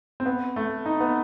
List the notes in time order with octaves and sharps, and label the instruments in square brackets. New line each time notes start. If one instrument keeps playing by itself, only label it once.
[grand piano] C4
B3
A3
D#4
B3